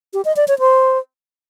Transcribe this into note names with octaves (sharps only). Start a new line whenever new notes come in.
G4
D#5
D5
C#5
C5